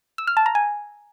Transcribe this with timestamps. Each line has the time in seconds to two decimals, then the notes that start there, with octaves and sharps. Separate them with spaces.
0.18 E6
0.27 F6
0.37 A5
0.46 A#5
0.55 G#5